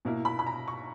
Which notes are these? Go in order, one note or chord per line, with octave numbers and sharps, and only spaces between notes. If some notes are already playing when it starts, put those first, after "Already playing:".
B2 A#3 E4
B5
B5
A#5
C#6